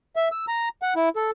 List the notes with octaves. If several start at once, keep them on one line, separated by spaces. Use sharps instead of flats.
E5
E6
A#5
F#5
E4
A4